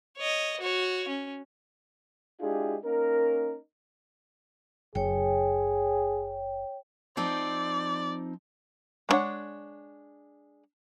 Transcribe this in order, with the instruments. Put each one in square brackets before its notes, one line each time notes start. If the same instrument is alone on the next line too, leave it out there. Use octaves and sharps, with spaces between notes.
[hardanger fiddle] C#5 D#5
F#4 C#5
C#4
[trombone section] G#3 D4 E4 F4 G4 G#4
A#3 C#4 D#4 A#4
[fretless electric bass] F#1 [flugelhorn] G#4 [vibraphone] C#5 G5
[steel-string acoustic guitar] F3 C4 D#4 [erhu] D5
[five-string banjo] G#3 B3 D4 C#5 F#5